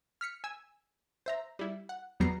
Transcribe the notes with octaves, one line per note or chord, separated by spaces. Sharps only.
F6 B6 C#7
G#5 E6
C5 E5 A#5
G3 E4
F#5
E2 F#3 G3 B3 A#5 C7